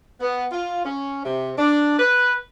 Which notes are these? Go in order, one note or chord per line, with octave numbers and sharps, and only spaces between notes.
B3
F4
C#4
C3
D4
B4